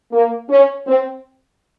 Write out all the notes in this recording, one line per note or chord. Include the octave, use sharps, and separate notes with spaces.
A#3
C#4
C4